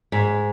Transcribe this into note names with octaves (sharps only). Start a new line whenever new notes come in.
G#2